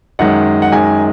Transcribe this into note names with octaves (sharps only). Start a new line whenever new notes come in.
F#2 D#3 G#3 F#5
F#5
F#2 D#3 G#3 G#5